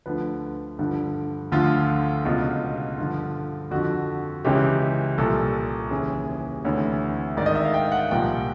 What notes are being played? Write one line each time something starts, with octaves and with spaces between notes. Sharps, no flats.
D2 D3 F3 B4
G2 D3 F3
D2 D3 F3 F4
C#2 B2 F4
G2 D3 F3 F4
F2 D3 F3 F#4
C#2 C#3 E3 G4
C2 A#2 F3 A4
D#2 C#3 E3 G#4
D2 C3 E3 C#5
G#2 D#3 D5
D#5
E5
F5
G5
F#5
C2 A#2 F3 G5